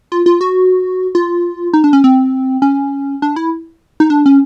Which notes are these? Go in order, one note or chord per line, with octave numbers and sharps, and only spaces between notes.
F4
F4
F#4
F4
D#4
D4
C#4
C4
C#4
D4
E4
D#4
D4
C#4